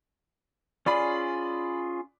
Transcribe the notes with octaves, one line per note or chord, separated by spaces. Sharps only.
C#4 F4 G#4 D5 B5